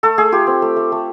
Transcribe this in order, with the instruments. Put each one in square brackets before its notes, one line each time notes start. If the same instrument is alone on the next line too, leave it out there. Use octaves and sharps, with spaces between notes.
[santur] A3 A4
A3 G#4
F4 G4
C4
A3
A3
A3